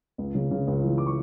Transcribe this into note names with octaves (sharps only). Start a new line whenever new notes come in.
C#2
C#3
C#3
C#2
E3
D6
C#6